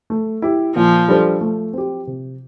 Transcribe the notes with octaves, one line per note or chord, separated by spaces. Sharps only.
A3
E4 G4
A#2 F3
G3 D4 A4 C5
A3
C4 G4
C3